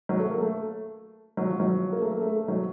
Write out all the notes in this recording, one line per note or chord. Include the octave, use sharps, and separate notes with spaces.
F#3
A3
A#3
A3
F#3
F3
F#3
A#3
A3
A#3
A3
A3
F#3